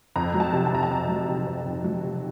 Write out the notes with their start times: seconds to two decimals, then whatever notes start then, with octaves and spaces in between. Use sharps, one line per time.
0.16 F2 A#5
0.34 F#3
0.40 A5
0.53 C3
0.66 A5
0.72 F2 A#5
0.83 A5
0.91 F2
1.09 F#3
1.28 C3
1.47 F2
1.66 F2
1.84 F#3
2.03 C3